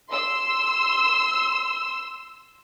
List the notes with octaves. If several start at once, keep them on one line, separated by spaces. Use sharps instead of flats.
C6 E6